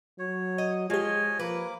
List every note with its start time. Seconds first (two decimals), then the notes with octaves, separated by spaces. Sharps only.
0.19 F#3 C#5
0.58 D#5
0.90 F3 G#3 F4 G4 C#5 D#5 G#5
1.39 F3 A#3 B4 D6